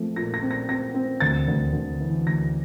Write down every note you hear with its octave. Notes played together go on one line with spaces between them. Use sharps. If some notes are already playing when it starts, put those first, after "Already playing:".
Already playing: F3 A3 C4
A#2 A#6
A#6
C4
A#6
C4 A#6
C4
D2 A6
D2
D2
E3
D2 A#6